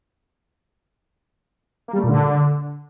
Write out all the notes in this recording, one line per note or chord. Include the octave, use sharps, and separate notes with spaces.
A#3
G3
A3
A#2
D3